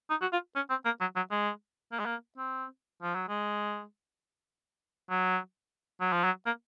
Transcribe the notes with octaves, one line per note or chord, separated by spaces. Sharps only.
D#4
F#4
F4
C#4
C4
A#3
F#3
F#3
G#3
A#3
G#3
A#3
C4
F3
F#3
G#3
F#3
F#3
F3
F#3
A#3